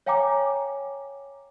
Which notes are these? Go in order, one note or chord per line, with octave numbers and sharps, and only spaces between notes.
C#5 F5 G5 G#5 A#5 D6